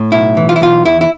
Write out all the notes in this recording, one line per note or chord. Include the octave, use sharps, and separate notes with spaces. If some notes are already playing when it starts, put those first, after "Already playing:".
Already playing: A2
B1 E4
E3
F4
E4
B1 F4
E2 E4
E4